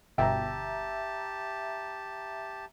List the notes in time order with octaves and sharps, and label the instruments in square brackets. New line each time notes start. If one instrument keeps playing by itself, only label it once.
[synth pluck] G1 B2 [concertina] G4 A5 [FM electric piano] E5 A#5 [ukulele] G5